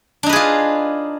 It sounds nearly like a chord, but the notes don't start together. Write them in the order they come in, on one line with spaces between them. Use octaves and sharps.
D4 D#4 B4 G#4 F4